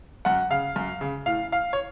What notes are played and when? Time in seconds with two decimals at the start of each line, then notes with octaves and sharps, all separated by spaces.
0.25 F#2 F#5
0.50 C#3 F5
0.76 F#2
1.01 C#3
1.26 A2 F5
1.52 F5
1.73 C#5